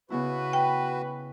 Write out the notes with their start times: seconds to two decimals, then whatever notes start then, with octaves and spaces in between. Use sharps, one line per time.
0.10 C#3 B3 E4 F#4 B4
0.53 G5